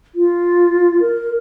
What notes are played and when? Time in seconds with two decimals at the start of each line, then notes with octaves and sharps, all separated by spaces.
0.15 F4
1.00 A#4